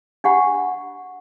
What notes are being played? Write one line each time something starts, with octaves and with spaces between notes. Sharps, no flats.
D4 G4 F#5 B5